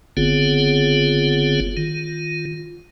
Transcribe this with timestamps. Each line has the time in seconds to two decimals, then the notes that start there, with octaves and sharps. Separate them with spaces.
0.17 F#1 D3 B3 C4 F4 G#4
1.77 D#3 F4